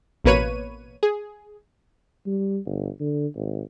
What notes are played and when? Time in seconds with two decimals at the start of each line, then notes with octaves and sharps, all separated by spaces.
0.24 A1 B2 A#3 B4 C#5 D#7
1.03 G#4
2.26 G3
2.66 G1
3.00 D3
3.36 G#1